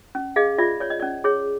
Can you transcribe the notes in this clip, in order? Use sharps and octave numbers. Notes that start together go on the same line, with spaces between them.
C#4
G#4 D#5 F5
F4 D5 E5
C#5 D5
D#5
C#4 D5
G#4 C#5